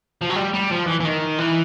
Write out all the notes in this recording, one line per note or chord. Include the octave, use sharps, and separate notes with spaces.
F3
F#3
G3
G3
F3
E3
E3
D#3
E3